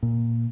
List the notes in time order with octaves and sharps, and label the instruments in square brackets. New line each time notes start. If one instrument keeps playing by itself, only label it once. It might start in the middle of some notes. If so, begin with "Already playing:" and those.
[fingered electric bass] A#2